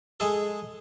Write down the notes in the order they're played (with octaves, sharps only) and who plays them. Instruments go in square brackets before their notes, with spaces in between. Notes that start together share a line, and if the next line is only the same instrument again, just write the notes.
[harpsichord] G#3 G#4 A4